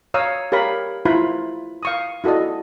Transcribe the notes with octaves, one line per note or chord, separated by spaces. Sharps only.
C#5 F5 A#5 D#6 E6
G4 A#4 C#5 F5 B5
E4 F4 C5 A#5 B5
F5 C#6 D#6
E4 F#4 A4 D5 D#5